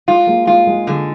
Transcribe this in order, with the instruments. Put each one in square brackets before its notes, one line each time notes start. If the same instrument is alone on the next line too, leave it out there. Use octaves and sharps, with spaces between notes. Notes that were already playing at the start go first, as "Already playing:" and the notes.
[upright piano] G#3 [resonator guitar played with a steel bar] F4
[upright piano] G#3 A#3
[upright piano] G#3 [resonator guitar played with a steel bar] F4
[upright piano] G#3
[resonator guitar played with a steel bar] D3 [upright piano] G#3